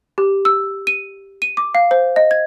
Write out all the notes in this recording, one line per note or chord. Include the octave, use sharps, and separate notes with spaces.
G4
E6
D#7
D#7
D6
F5
C5
D#5
G#6